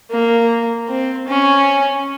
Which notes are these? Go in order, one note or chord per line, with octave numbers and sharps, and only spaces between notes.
A#3
C4
C#4